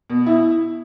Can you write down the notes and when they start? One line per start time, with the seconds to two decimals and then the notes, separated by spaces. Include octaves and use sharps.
0.10 B2
0.26 E4